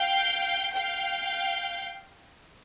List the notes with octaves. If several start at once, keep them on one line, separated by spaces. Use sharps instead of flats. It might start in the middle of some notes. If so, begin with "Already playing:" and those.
Already playing: F5 G5
F5 G5